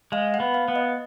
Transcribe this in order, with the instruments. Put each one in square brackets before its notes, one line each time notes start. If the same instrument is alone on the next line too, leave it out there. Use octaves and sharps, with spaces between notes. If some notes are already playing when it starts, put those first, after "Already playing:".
[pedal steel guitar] G#3 [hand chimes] F5
[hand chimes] F#5
[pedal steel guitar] B3
[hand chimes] F5
[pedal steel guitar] B3
[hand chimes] D#5